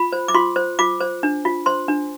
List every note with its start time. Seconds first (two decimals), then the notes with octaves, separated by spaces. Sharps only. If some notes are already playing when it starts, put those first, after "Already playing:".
Already playing: F4 B5
0.12 C5
0.28 D6
0.35 F4 C6
0.56 C5
0.79 F4 D6
1.00 C5
1.23 D4
1.45 F4
1.66 C5 C6
1.88 D4